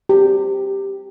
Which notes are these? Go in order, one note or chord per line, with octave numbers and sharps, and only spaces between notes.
G4